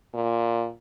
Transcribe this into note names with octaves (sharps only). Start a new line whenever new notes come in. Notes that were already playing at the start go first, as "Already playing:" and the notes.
A#2